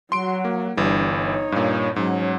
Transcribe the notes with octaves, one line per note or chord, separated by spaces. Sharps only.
F#3 F#4 C6 D7
A#3
G1 E3 G3 D4
D#4 C#5
G2 A#2
G#2 F#3 C#4